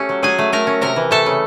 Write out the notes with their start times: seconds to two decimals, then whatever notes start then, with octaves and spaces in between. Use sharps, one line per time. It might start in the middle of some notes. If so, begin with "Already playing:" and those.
Already playing: A3 C#4 G4
0.09 F#3
0.23 F#3 G#4 G#5
0.39 A3
0.52 A3 A#4 A#5
0.67 C#4
0.81 C3 A#4 A#5
0.96 E3
1.11 A3 A4 A5
1.26 C#3